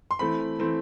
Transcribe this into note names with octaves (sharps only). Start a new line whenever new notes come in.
C6
E3 A3 C4 B5
E3 A3 C4